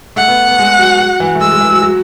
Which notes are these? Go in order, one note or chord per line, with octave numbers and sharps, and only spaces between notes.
A3 F#5
B3
B3
G#3
F#3
F#3
E3
A3
G#3 E6
G#3
E3
F#3
F#3